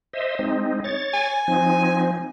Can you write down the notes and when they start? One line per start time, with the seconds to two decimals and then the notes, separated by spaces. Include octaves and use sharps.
0.13 C5 D#5 E5
0.39 G#3 C4 D#4
0.84 C#5 A6
1.14 G#5
1.48 F3 C4 D#4